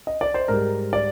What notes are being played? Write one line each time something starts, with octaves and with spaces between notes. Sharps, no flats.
D#5
D5
C5
G#2 G3 A#4
D5